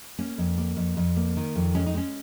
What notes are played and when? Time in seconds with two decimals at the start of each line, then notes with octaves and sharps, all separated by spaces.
0.19 A#3 C#4
0.38 F2
0.58 A#3
0.77 F2
0.97 F2
1.17 A#3
1.37 D#3
1.56 F2
1.75 G#3 C#4
1.86 D#4
1.95 G#3 C#4